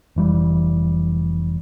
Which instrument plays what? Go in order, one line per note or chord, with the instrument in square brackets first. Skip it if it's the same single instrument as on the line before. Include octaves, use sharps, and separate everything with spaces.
[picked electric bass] F1 E3 G3